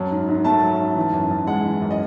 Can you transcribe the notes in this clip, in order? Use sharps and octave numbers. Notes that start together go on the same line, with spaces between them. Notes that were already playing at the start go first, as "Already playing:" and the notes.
Already playing: F#2 F#3 A5
G#2
G#2
A3 A5
F#3
G#2
E3
F#2
F#2
G#3 F#5
E3
F#2
D#5